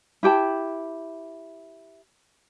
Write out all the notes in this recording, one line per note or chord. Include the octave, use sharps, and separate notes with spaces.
E4 G4 G5 A5